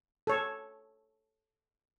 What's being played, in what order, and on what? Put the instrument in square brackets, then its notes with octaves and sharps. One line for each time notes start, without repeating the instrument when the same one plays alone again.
[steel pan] A4 C#5